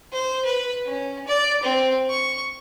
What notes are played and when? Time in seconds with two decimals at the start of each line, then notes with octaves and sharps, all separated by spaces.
0.12 C5
0.45 B4
0.86 C#4
1.28 D5
1.63 C4
2.10 C#6